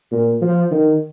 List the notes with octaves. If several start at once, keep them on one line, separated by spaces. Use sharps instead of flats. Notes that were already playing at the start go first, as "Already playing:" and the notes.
A#2
F3
D#3